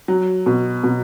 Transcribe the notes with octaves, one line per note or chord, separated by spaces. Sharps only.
F#3
B2
B2